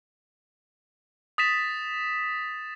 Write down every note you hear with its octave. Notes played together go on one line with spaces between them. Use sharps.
D#6 A6 B6 E7